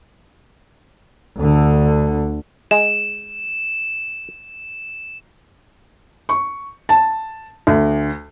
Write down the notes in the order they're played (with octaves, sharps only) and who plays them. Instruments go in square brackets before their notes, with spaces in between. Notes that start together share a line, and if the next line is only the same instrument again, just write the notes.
[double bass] D2 D3
[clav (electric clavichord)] G#3 [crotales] E7
[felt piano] C#6
A5
D2